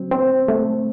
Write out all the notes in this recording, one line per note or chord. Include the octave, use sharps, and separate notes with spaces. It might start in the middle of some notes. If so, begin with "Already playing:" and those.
Already playing: F#3 C4
C4
A3